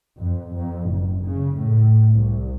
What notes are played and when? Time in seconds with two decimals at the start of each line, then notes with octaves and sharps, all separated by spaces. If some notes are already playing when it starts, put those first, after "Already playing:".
0.17 F2
0.54 F2
0.89 F#1
1.24 C#3
1.58 A2
2.14 C2